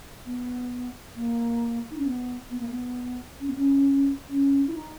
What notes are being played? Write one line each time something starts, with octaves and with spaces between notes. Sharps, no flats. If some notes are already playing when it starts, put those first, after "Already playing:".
B3
A#3
D#4
C#4
B3
B3
A#3
B3
C#4
B3
C#4
C#4
E4
D#4